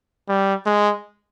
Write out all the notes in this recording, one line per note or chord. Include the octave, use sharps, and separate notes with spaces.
G3
G#3